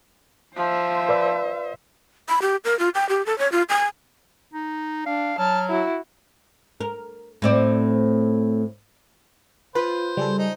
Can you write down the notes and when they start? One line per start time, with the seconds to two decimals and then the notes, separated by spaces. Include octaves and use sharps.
0.56 F3 C5 E5
1.09 B4 D5 E6
2.29 B5
2.42 G4
2.65 A#4
2.79 F4
2.95 G5
3.09 G4
3.26 A4
3.39 C#5
3.52 F4
3.69 G#5
4.54 D#4
5.06 D4 F5
5.39 F#3 A5 F6
5.69 E4 F#4
6.81 A#4
7.42 A2 C4 D5
9.75 F4 B4 C5
10.17 C#3 G3 G#4 A4
10.39 D#4 C5